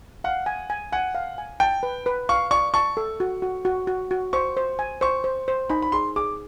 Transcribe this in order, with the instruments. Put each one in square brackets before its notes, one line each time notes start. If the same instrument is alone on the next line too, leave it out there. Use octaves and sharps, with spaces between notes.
[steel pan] F5 [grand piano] F#5
[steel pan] G#5
G#5
[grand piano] F#5 [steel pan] G#5
[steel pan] F5
G#5
[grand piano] G5 [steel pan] A5
[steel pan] B4
B4
[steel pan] F5 [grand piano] C#6
[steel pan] D5 [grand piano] C#6
[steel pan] A5 [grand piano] C#6
[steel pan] A4
F#4
F#4
F#4
F#4
F#4
[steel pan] C5 [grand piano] C#6
[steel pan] C5
G#5
[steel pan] C5 [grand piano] C#6
[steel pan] C5
C5
[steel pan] D#4 [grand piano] B5
[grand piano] B5
[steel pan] G#4 [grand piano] C6
[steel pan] G#4 [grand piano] D6